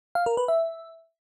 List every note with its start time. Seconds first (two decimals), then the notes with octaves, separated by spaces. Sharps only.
0.15 F5
0.26 A#4
0.37 B4
0.48 E5